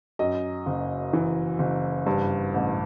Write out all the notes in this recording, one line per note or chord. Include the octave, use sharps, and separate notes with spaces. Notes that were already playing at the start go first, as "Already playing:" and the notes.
F#2 D#5
F#1
E3
F#1
G2
A1